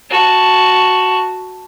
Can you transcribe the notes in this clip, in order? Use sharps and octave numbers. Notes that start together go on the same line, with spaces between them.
F#4 A5